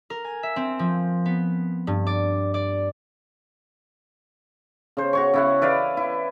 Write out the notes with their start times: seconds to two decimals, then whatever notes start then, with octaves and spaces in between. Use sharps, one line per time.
0.10 A#4
0.24 G#5
0.43 E5
0.56 C4
0.79 F3
1.26 B3
1.87 G2
2.07 D5
2.54 D5
4.97 C#3 C5
5.13 F#4 C#5 C#6
5.34 C#3 E4 F#5
5.61 E4 B4 D5 F5
5.97 E4